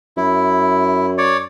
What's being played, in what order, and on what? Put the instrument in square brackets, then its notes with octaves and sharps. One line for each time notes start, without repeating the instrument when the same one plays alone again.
[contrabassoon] F#2 [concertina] E4
[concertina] C#5 D5